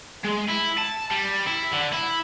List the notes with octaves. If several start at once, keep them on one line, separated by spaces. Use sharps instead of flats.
G#3
E4
A5
G3
E4
D3
E4